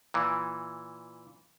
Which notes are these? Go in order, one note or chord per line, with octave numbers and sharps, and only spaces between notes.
A#2 E3